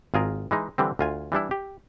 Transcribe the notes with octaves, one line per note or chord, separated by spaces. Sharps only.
G#1 F4 G#4 A#4
E3 G#3 D#4
D3 E3 G3 C4
D2 F4 G#5
E3 G3 D4 E4
G4